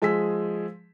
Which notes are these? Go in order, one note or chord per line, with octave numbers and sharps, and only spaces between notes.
F3 G#3 G#4 E6 B6